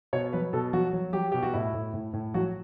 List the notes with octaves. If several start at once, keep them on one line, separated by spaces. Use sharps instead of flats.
B2 C#5
F#3 B4
B2 A4
F#3 F#4
F#3
F#3 G4
B2 G4
F#4
A2 E4
A2
A2
A2
F#3 F#4